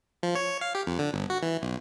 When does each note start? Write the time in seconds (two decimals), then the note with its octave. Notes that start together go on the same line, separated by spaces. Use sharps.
0.23 F3
0.35 C#5
0.61 F5
0.75 G4
0.87 F2
0.99 D3
1.14 G1
1.30 F#4
1.42 E3
1.62 B1